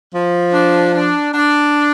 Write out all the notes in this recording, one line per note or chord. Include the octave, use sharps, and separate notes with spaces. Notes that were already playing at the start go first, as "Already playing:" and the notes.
F3
D4
D4
D4